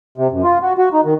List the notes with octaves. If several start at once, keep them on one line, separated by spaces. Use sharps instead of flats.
C3
F#2
F4
F#4
F#4
D#4
D#3